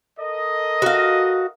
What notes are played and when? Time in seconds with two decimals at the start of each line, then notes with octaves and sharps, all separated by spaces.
0.18 A4 A#4 D#5
0.82 F#4 F5